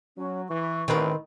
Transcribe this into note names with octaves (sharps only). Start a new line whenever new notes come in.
F#3 C#4
E3 C#6
A1 D#3 C4 A#4 B4